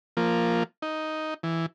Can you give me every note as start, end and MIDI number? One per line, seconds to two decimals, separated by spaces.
0.17 0.63 53
0.17 0.63 58
0.82 1.34 63
1.43 1.66 52